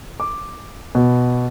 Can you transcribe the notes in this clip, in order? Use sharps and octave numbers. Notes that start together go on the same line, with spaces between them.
D6
B2